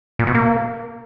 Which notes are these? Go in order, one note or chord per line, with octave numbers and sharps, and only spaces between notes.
A#2
B2
A#3